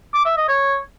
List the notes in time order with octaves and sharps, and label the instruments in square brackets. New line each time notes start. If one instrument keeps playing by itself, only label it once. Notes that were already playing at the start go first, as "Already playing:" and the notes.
[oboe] D6
E5
D#5
C#5